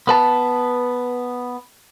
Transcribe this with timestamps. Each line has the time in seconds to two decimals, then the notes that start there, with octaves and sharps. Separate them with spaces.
0.07 B3 B4 A5